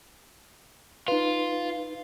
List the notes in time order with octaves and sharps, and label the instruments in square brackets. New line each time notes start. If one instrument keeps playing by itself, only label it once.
[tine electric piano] D#4 B4 [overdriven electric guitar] F4